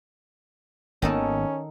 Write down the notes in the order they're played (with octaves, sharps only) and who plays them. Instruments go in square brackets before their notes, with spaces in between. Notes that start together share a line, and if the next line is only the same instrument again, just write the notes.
[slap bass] G#1 A#3 B3 [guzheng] D#3 D#4 A4 [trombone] C#4